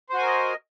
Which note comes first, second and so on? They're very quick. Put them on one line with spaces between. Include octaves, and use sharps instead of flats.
C5 F#4 G#5 A#4 D#5